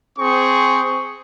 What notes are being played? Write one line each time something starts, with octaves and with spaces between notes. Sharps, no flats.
C4 G#4 C#6